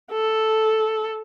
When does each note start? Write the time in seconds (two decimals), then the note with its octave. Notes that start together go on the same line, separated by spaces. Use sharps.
0.12 A4